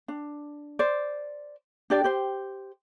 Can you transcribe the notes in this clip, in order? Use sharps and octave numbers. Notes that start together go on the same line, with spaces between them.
D4
C5 D5
D4 G4 D5
G4 C5